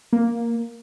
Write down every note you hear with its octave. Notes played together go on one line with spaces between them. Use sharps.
A#3